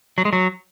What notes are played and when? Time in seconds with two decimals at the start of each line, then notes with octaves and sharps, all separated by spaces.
0.18 F#3
0.25 G#3
0.33 F#3